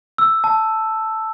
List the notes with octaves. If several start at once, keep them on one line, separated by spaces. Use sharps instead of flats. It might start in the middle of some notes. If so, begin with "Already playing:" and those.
E6
A5